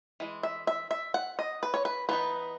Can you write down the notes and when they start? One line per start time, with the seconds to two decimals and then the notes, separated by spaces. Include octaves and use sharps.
0.20 E3 G#3
0.43 E5
0.67 E5
0.91 E5
1.14 F#5
1.39 D#5
1.63 B4
1.74 C#5
1.85 B4
2.09 E3 B3 D#4 B4